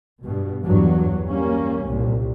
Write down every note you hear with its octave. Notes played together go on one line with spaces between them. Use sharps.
G2 B2
E2 G2 F#3
G3 A#3 C#4
C2 A#2